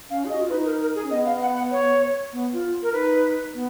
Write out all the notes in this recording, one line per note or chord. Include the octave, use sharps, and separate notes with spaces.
C#4 F5
G#4
D#5
F#4
F4
D#4 B4
A#4
A#4
G#4
C#4
B3 D#5
F5
F#5
F#5
C#5
B3
F4
A#4
D#4 B4
B3